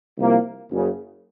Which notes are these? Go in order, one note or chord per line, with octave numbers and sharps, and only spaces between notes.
C2 C3 F3 A#3
F#1 F#2 C#3